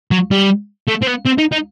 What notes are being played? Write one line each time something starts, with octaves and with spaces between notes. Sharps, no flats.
F#3
G3
A3
C4
B3
C4
D#4
D#4